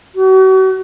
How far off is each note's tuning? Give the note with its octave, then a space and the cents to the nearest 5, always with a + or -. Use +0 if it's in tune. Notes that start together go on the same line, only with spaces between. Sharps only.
F#4 +40